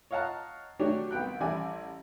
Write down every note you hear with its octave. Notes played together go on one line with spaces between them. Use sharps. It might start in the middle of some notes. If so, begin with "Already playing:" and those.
C#5 D#5 F5 F#5 A5 A#5
F#3 A3 D4 G4 C#5
C2 B3 G5 F#6
A1 G3 G4 D5 E5 G#5